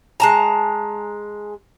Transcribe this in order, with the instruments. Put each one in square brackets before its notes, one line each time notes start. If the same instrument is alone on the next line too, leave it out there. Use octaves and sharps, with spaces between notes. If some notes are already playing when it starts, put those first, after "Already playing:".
[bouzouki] G#3 A5 A#5